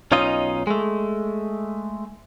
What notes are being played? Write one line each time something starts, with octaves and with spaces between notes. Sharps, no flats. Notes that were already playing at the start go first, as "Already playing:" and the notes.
B1 C#4 D#4 F4 D#5
G#3 A3